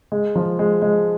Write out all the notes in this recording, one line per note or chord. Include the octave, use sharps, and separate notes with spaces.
G#3
F3
G#3
G#3